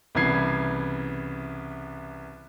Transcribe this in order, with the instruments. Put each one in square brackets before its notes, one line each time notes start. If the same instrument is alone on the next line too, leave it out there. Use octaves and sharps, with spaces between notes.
[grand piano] C2 C#3 E3 B3 G#6 C7